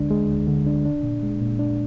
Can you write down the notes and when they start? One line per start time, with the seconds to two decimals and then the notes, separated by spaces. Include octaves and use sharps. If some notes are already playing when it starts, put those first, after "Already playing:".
Already playing: D2 D3 G#3 D4
0.10 G#3
0.29 D2
0.47 D3
0.67 D4
0.85 D4
1.03 A#2
1.23 G#3
1.41 A#2
1.59 D4